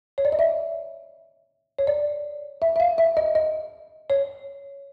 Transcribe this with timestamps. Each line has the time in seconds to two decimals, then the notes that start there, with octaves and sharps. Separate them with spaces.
0.18 C#5
0.25 D5
0.32 D#5
0.39 E5
1.79 C#5
1.87 D5
2.62 E5
2.76 E5
2.80 F5
2.98 E5
3.17 D#5
3.35 D#5
4.10 C#5